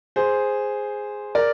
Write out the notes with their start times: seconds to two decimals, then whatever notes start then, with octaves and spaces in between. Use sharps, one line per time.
0.16 G#4 C5
1.35 A#4 D5